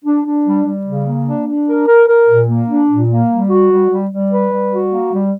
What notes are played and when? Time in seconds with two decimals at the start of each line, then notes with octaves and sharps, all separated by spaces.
0.05 D4
0.25 D4
0.45 G3
0.66 G3
0.86 C#3
1.06 A#3
1.26 D4
1.47 D4
1.67 A#4
1.87 A#4
2.08 A#4
2.28 A#2
2.48 A#3
2.68 D4
2.89 A#2
3.09 A#3
3.30 G3
3.50 F#4
3.71 G3
3.90 G3
4.11 G3
4.32 B4
4.51 G3
4.72 F#4
4.92 A#3
5.12 G3